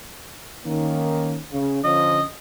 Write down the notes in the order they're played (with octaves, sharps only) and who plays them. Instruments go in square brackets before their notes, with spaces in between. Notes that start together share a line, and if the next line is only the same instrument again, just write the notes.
[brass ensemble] D#3 A#3 C#4
C#3
[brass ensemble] D3 F3 C#4 [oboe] D#5